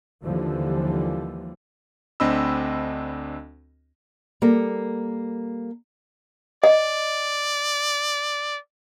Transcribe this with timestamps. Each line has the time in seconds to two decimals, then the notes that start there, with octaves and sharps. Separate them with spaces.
0.25 D#2 D3 E3 F3 G3
2.20 D2 C4 D4 D#5 B5 E6
4.42 G3 A#3 A4 A#4
6.64 D5 D#5